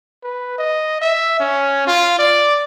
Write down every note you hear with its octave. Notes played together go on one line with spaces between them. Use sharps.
B4
D#5
E5
C#4
F4
D5